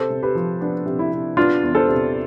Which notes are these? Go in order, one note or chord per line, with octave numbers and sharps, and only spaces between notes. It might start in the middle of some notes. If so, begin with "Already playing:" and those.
Already playing: C3 A4 C5
C3
G4 B4
F3
B3 D4
C3
E4
C3
B3 D4 F4
E2
A4 C5
C3